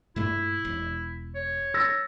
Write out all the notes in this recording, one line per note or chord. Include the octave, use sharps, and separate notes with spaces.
G2 A#2 A3 E4
E1
C#5
E6 A6 A#6